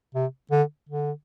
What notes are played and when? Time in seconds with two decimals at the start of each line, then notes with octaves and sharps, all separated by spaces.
0.15 C3
0.51 D3
0.89 D3